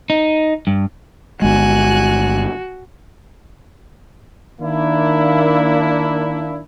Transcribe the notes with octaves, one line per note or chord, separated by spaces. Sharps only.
D#4
G2
G1 G#3 F#4 G#5 F#6
D#3 A#3 D4 E4